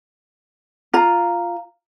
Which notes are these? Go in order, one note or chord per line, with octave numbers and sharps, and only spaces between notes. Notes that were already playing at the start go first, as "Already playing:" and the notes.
F4 A#5